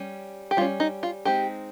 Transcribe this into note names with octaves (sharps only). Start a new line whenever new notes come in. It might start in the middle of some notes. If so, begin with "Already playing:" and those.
Already playing: G3 C#4
G4
G3 C#4 F4
D#4
F4
G#3 C4 D#4 G4